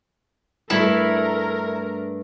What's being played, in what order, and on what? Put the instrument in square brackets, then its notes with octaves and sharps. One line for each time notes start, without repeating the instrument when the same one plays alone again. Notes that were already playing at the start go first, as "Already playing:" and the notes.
[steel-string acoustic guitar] G2 A3 D4 [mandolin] E4 [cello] A#4